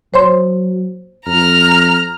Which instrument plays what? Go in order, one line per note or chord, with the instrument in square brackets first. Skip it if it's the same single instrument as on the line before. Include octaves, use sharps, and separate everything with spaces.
[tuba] F#3 [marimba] C5 C#5 C6
[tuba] F2 [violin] A#5 F6